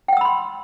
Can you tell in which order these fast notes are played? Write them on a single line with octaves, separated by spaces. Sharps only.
G5 F#5 E6 B5 C6